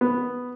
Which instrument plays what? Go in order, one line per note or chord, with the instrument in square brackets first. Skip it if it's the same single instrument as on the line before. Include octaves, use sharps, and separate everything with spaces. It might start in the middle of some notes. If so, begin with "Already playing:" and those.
[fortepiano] B3